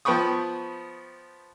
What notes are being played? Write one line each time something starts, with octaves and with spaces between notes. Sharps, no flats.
F3 B3 G5 B5 C#6 D#6